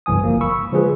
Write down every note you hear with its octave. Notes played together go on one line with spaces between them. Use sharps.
G1 C2 E3 G#5 D#6
F3 A#3
B5 C#6 E6
D3 F3 G#3 G#4 B4